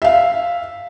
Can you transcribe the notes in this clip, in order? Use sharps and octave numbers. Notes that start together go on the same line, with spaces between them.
E5 F5